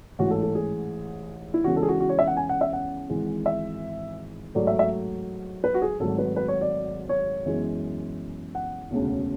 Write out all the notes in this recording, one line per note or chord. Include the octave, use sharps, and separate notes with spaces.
A1 G#2 E3 F#4
A4
A4
G#4
E4
E2 C#3 E3 G#3 F#4
A4
G#4
F#4
F#4
C#5
E5
F#5
G#5
F#5
E5
F#5
G#1 G#2 E3 G#3
E5
A1 G#2 F#3 A3 D5
E5
E5
B4
F#4
G#4
G#1 G#2 F#3 A3 A4
B4
B4
C#5
D5
C#5
F#2 E3 G#3 B3
F#5
E1 D2 C#3